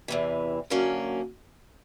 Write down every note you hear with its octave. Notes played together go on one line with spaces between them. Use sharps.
E2 C3 E3
F#2 D3 F#3 A#3 C#4